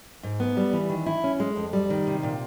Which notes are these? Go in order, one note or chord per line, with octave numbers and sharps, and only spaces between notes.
G#2
B3
G3
E3
D#3
E4
C#4
G#3
F2
G3
D#3
C3
A#2